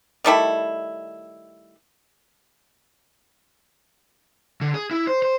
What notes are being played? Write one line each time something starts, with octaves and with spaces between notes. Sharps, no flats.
D#3 G3 A3 E4
D3
G#4
E4
C5
C5